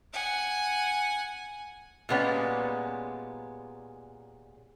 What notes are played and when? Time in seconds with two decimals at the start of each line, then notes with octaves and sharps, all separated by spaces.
0.13 F#5 G#5
2.09 A#2 G3 G#3 B3 C#4